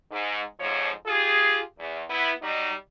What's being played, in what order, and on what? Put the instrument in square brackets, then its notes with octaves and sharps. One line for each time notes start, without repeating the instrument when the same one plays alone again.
[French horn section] G#2
F2 G#2 F3 C#5
F4 G4 G#4
E2
B3 E4
F#3 G3 D#4